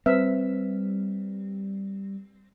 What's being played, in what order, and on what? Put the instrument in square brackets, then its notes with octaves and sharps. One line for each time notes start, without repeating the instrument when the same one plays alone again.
[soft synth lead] G3 [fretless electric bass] C4 [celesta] B4 C5 [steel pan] E5